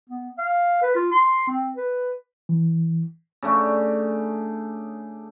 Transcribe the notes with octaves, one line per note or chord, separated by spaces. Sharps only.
B3
F5
B4
F4
C6
C4
B4
E3
C#3 A3 D4